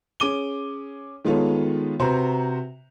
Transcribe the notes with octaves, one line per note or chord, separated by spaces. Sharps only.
C#4 G#4 D6 D#7 G7
D#3 G#3 B3 F4 A4 C#5
C3 F#4 B4 C5 A#5